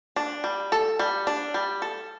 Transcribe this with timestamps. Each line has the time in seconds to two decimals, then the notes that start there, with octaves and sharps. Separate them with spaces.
0.16 D4
0.44 G3
0.72 A4
0.99 G3
1.27 D4
1.54 G3
1.82 A4